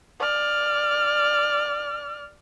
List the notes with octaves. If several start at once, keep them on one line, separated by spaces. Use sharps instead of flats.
D5 F6